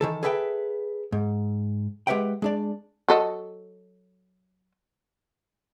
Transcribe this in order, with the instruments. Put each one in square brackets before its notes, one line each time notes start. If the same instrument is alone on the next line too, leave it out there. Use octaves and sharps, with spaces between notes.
[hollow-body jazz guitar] D#3 E3 A4
G#4 A4 B4 E5 F#5 G5
G#2
G#3 G4 B4 E5 F#5 G5
G#3 D4 D5
[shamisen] F#3 A4 D#5